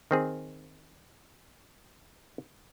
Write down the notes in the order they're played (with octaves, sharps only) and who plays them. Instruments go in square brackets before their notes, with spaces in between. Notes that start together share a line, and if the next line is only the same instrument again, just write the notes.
[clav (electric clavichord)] D#3 C4 G#4